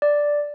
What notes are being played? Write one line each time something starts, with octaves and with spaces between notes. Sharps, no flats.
D5